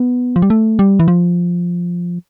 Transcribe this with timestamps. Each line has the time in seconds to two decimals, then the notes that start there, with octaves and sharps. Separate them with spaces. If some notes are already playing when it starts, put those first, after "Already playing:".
Already playing: B3
0.36 F3
0.42 G3
0.50 A3
0.79 G3
0.99 E3
1.08 F3